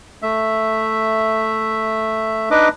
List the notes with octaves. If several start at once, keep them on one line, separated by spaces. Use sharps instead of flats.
A3 E5
D4 D#4 B4 D#5 D6